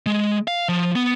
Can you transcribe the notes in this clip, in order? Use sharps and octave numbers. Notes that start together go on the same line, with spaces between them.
G#3
F5
F3
B3